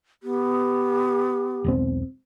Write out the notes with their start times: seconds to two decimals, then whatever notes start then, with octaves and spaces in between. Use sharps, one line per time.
0.23 B3 G4
1.64 E1 B1 C4